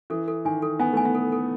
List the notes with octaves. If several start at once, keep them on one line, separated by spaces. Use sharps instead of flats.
E3 A4
A4
D#3 G#5
A4
B3 G#5
A3 G#5
B3
A4
A4